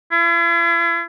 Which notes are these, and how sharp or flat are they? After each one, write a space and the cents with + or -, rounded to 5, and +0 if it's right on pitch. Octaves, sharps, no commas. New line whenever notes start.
E4 +45